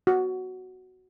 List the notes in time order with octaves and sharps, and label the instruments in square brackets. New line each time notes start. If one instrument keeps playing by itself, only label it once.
[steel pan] F#4